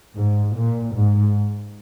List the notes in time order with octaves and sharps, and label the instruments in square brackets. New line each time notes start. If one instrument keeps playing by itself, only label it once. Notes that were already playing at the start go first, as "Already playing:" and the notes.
[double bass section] G#2
A#2
G#2